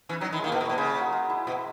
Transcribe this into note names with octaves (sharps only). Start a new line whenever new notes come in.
E3 C#4
F#3 D#4
D#3 E4
G#3
D#3 A#3
B2
A#2
B2
C#3 G#3
F#3
G#3
E4
B2 E4